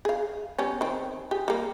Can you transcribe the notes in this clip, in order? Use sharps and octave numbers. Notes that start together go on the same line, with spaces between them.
G#4 F5
G3 B3 C#4
D#3 C4
G4 G#4
G3 A#3